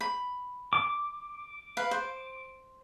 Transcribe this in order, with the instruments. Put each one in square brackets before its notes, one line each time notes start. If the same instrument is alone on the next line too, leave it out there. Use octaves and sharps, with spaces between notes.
[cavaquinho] B5
[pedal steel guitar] D6
[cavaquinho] B4 F5
C5